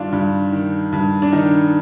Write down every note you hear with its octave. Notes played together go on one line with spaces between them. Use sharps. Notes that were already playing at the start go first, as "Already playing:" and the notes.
Already playing: G2 D#3 D4 F4
G2
D#3
G2
D4
D#3 D#4